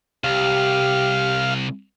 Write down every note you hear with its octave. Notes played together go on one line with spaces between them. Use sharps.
C2 G4 F5